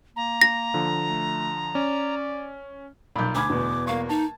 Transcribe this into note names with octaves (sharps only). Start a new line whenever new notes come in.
A#3 A#5
A#6
D3 F3
A3
C#4 D5
B1 A#2 B5 G6
D2 G#5 B5 D6 G#6
E2 B2
A#3 F5 C#6
D#4 A5